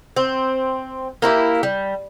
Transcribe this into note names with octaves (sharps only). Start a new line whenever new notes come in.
C4
A#3 E4 F#4 G4
G3